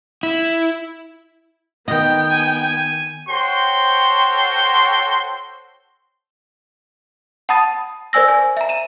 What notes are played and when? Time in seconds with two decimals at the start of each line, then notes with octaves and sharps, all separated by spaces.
0.23 E4
1.88 D#3 B3 D#5 G5
2.30 G#5
3.28 F#4 A4 C5 C#5 G5 C6
7.49 F#5 A5 B5 D#6 A6 D#7
8.13 A#4 C5 D5 G#5 E6 A#6
8.28 G#5
8.57 E5 A#5
8.69 D#7 E7